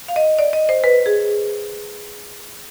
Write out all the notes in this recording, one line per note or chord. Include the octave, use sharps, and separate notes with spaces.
F5
D#5
D5
D#5
C5
B4
G#4